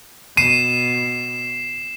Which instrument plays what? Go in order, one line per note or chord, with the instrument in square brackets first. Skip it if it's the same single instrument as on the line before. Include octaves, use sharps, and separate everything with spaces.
[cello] B2 [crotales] C7 E7 [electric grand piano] D#7